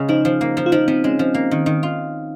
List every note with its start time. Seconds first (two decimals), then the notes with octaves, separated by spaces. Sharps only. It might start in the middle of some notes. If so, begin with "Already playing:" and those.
Already playing: C#3 G#3
0.08 F3 D#4
0.25 F3
0.41 A#3
0.57 F3
0.66 F4
0.72 F3 D#4
0.88 F3 C4
1.04 G#3 C#4
1.19 F3
1.34 A#3
1.51 D#3
1.66 D#3
1.83 F4